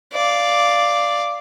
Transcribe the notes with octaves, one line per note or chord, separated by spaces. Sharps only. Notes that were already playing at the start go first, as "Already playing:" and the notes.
D5 F5